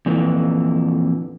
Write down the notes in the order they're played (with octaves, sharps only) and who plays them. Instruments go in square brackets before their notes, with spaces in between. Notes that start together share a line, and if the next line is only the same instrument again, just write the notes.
[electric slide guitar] F2 A#2 D3 E3